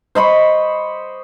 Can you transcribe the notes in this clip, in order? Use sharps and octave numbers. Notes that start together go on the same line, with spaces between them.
C5 D#5 B5 C#6